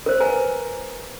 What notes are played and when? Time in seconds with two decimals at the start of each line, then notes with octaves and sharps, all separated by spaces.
0.06 A#4 C5
0.20 B4 G#5 A#5